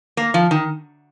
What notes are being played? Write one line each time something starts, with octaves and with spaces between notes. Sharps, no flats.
A#3
F3
D#3